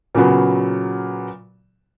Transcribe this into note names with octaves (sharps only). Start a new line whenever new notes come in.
A#2 C#3 F#3 B3